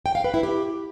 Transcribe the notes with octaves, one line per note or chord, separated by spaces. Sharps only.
G5
F5
B4
E4
G4